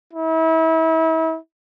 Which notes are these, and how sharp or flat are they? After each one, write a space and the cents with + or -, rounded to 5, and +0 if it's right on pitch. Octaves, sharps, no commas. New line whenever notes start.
E4 -35